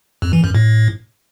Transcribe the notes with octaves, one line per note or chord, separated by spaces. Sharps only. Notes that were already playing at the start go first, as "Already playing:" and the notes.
F2
E3
F#2
A2